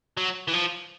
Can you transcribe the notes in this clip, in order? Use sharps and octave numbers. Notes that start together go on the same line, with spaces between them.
F#3
E3
F3